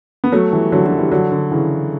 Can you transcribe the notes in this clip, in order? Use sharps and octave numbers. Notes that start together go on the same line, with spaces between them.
B3
F#3 A3
E3 G3
D3 F#3
D3 F#3
E3 G3
D3 F#3
D3
C#3 E3